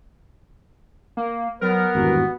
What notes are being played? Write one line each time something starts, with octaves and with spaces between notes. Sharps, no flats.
A#3
F#3 B3 A#4 B4
G#1 E2 G2 F#4